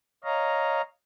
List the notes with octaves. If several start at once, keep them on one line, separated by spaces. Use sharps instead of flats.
C#5 D#5 F5 A#5